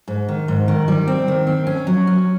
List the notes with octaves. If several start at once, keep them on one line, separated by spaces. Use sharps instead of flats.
G#2
D#3
G#2
D#3
G3
C4
D#3
C4
C#4
F#3
C#4